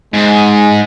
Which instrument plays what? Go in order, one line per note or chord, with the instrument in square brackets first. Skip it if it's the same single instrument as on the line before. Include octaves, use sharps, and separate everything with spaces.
[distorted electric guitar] G#2 [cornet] G#3